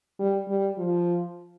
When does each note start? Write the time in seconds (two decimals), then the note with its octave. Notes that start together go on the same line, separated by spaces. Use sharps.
0.19 G3
0.48 G3
0.78 F3